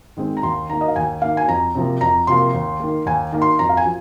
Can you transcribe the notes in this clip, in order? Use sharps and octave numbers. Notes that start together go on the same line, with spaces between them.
D#3 G#3 C4
A#5
D#2 C6
D#3 A#3 A#5
D#5
F5
D#2 G#5
D#3 A#3 F5
G#5
F2 A#5
C3 F3 A#3
F2 A#5
C3 F3 A#3 C6
D#2
D#3 A#3
D#2 G#5
D#3 A#3
C6
F2 A#5
F5
G#5
F3